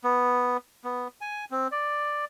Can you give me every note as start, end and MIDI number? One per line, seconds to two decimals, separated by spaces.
0.04 0.57 59
0.84 1.08 59
1.21 1.45 80
1.51 1.68 60
1.72 2.25 74